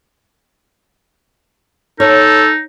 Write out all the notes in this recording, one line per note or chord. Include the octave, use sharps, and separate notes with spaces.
D#4 A4 C#5